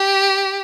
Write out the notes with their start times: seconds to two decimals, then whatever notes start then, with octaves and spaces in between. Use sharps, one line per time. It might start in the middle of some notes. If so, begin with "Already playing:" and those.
Already playing: G4